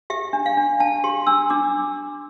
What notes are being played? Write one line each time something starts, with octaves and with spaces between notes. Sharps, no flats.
G4 E5
D4
F5
D4
D4 A5
G4 C6
D4 E6
D4 D6